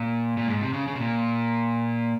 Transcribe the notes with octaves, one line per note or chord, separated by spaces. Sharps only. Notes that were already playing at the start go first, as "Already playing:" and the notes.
Already playing: A#2
A#2
G#2
C3
C#3
C#3
C3
A#2